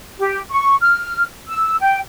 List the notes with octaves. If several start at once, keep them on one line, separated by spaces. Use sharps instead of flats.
G4
C#6
F6
E6
G5